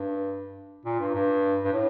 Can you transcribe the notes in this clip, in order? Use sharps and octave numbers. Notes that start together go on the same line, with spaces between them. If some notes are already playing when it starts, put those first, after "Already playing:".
Already playing: G2
A#2
G2
G2
G2
A2